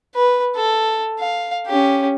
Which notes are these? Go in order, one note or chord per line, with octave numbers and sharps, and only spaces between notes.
B4
A4
F5
C#4 G4